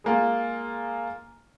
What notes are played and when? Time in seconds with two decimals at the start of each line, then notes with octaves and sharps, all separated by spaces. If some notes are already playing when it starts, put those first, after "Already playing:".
0.04 G#3 A#3 F4